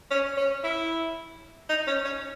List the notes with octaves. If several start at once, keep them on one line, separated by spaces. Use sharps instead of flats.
C#4
C#4
E4
D#4
C#4
C#4